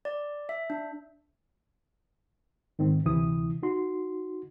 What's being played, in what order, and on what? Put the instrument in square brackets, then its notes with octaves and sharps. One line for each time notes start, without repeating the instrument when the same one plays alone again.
[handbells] D5
E5
D4
[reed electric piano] G#2 D#3 C4
D2 C3 E3 E4 D#6
D#4 F#4 C6